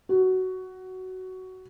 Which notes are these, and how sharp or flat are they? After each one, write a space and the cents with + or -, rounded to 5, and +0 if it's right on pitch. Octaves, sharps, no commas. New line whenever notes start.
F#4 +10